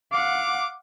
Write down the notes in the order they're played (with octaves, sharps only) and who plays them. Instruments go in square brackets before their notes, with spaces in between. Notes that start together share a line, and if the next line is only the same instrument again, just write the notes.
[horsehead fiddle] F5 F#5 [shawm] D6